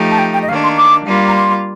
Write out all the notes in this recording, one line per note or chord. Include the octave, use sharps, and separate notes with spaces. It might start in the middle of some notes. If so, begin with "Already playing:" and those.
Already playing: F3 A3 D#4 G4
A5
G5
G5
D#5
D#3 A#3 D4 F5
C6
D6
G3 A#3 F4
A#5
C6